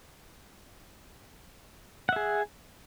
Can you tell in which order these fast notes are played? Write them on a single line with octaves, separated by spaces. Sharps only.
F#5 E5 G#4